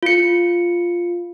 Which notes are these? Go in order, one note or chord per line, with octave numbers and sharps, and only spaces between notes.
F4 C#7